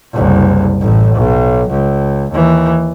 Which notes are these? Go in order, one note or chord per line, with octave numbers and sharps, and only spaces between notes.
F#1 C2
A1 A2
B1
C#2
D#2 E3